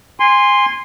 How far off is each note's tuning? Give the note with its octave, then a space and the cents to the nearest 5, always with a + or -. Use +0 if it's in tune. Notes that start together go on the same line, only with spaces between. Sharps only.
G#5 -20 C6 +0